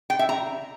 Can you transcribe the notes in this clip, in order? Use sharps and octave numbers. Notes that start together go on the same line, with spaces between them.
G5
E5
A#5